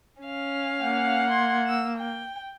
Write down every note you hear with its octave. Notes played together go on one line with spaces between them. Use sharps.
C#4 F5
A#3 F#5
C6 G#6
E6 E7
G5